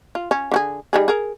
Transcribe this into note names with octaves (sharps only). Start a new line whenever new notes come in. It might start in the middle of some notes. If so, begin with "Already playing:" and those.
F4
C#4
D3 F#4 G#4
G3 D#4 G#4
G#4 A#4